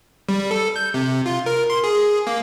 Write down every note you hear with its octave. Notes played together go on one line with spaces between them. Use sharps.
G3
A4
G6
C3
F4
A#4
C6
G#4
A#3